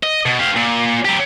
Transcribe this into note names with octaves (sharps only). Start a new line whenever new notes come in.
D#5
B2
G4 F5
A#2
F#3 G4